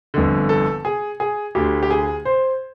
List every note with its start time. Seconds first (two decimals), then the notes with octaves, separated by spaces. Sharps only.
0.14 G1 F2 D3
0.49 A4
0.85 G#4
1.20 G#4
1.55 D2 D3 G4
1.83 G4
1.91 G#4
2.25 C5